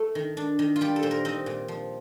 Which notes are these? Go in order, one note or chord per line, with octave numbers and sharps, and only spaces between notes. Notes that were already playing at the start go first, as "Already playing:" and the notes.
Already playing: A3
D#3
D4
D#3
F4
G3 G4
A4
A#2 C5
A#4
C4 D#4
A#2
F3